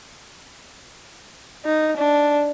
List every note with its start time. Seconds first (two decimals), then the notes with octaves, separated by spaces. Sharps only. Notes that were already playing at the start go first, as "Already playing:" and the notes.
1.66 D#4
1.97 D4